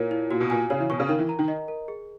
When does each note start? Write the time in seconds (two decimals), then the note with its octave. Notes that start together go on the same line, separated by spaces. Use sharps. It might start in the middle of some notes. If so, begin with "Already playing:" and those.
Already playing: A#2 E4 A#4 C#5
0.11 E4
0.31 A#2 F#4
0.40 B2
0.50 A#2 G#5
0.70 C#3 C#5
0.80 E3
0.90 B2 C#6
1.00 C#3
1.09 D#3 A#4
1.19 E3
1.29 A#5
1.39 D#3
1.48 D#5
1.68 A#4
1.88 G#4